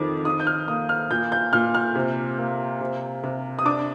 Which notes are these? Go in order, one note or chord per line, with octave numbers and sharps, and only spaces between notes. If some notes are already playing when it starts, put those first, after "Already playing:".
Already playing: F2 D#3 D6
D#3 D#6
G6
F6
A#3 D#6
F6
A#2 G6
G6
A#2 F6
F6
C3
A#3
C3
C3
D#6
D4 D6